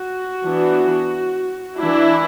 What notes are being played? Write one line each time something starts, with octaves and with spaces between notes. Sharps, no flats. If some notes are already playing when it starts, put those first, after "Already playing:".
Already playing: F#4
E3 B3 D4
E3 D4 E4